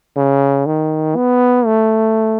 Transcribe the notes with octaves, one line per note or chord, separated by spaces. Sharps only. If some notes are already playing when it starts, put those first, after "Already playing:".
C#3
D#3
B3
A3